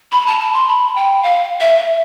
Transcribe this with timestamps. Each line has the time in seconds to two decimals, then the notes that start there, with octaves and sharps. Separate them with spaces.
0.12 B5
0.27 A5
0.40 A5
0.53 C6
0.68 B5
0.96 G5
1.23 F5
1.60 E5